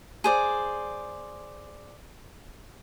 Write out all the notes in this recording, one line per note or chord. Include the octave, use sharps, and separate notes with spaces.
G#4 C5 D5